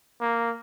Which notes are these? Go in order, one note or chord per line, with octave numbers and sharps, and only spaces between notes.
A#3